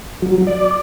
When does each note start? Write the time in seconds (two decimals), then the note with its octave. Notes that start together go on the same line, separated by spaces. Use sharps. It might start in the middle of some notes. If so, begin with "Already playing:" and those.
0.22 F#3
0.47 D5